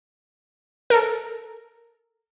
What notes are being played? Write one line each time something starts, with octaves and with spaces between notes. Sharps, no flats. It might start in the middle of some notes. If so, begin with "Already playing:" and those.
A4 A#4